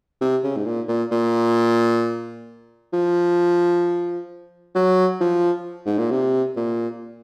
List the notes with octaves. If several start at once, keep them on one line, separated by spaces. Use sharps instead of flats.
C3
C#3
G#2
A#2
A#2
A#2
F3
F#3
F3
G#2
A#2
C3
A#2